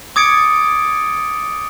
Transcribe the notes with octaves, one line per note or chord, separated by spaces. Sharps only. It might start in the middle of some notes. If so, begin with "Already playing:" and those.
D6 D#6 G#6 A6 C#7 D7